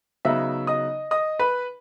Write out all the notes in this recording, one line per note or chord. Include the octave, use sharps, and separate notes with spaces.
C#3 F#3 B3 D#4 E5 E6
D#5 D#6
D#5 D#6
B4 B5